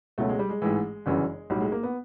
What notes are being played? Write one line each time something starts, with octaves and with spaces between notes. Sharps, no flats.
C#2 B2 F#3 A3
G#3
G3
G#3
A1 G#2 E3
G1 F#2 C#3 E3
B1 A2 F#3 G3
G#3
A#3
B3